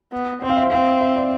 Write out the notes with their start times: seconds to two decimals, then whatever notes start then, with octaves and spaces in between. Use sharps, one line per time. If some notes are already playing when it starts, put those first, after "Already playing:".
0.12 B3
0.42 C4 C5
0.50 F5
0.56 E5
0.71 C4 F5
1.01 E5
1.16 D5